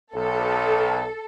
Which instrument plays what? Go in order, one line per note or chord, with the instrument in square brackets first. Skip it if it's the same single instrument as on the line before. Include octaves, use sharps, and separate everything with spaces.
[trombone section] B1 [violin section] A4